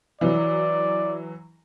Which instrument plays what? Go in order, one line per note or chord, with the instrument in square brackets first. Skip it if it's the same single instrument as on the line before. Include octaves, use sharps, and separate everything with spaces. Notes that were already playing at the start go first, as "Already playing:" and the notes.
[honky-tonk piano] E3 F#3 [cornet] D5